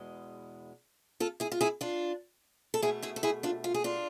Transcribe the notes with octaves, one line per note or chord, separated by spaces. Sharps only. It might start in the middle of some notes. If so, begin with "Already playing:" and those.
Already playing: E2 B2 G#3
F4 A4
E4 G#4
F4
E4 G#4
D4 F4
A4
B2 A3 E4 G#4
E4 G#4
A4
E4 G#4
D4 F4
F4
G#4
D4 F4